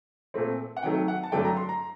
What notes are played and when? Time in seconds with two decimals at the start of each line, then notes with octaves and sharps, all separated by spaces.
0.34 A#2 A3 C4
0.76 F#5
0.83 C3 D#3 F#3 A3 G5
1.08 F#5
1.23 A5
1.32 G2 D3 F#3 A3 D4 G5
1.44 A#5
1.57 C6
1.69 A#5